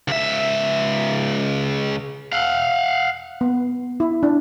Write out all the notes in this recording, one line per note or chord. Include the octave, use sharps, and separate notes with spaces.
C#2 E5
F5 F#5
B3
E4
D4